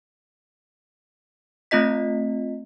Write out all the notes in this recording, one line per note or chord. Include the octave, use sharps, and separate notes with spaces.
A3 C4 F4 D#5 B6